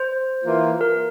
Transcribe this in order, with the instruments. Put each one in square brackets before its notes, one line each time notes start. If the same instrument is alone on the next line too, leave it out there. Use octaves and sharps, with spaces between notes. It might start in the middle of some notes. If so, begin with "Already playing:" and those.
Already playing: [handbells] C5
[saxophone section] E3 A#3 F4
[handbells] A#4